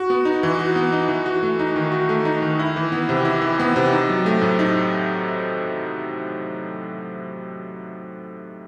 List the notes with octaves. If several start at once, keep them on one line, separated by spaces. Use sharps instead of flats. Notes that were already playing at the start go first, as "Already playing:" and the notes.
Already playing: F#4
B3
D#4
E3
F#4
B3
D#4
E3
F#4
A3
D#4
D#3
F#4
A3
D#4
D#3
E4
E3
B3
C3
E4
E3
B3
C3
D#4
F#3
A3
A2
D#4